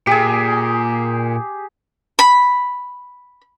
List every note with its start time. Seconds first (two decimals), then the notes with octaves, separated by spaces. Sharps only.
0.07 A#2 G4 G#4
2.19 B5